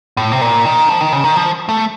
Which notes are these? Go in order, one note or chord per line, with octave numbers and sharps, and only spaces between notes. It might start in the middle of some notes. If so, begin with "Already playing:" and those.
A2
C3
A#2
D#3
F3
D#3
C#3
D#3
F3
A3